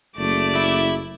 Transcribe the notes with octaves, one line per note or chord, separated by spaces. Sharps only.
F#1 A3 D5
E4